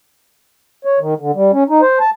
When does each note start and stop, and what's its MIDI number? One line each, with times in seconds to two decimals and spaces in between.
0.85 0.99 73
1.00 1.14 51
1.20 1.31 50
1.35 1.51 55
1.53 1.64 61
1.70 1.81 63
1.82 1.99 72
2.00 2.10 81